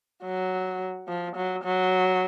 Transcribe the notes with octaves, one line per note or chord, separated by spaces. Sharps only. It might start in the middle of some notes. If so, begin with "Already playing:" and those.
F#3
F3
F#3
F#3